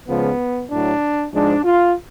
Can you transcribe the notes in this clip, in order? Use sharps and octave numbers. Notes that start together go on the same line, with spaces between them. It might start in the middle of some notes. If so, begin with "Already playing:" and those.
C#2 C#3 F3 G#3 B3
A2 F#3 D4
G#2 F3 G#3 D4
F4